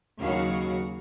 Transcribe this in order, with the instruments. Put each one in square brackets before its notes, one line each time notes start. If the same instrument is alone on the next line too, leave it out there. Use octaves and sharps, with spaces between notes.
[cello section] D#2 C#3 F#3 F#4 F5